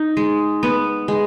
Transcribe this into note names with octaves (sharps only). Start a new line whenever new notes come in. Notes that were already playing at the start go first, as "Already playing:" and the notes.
Already playing: D#4
G#3
B3
G#3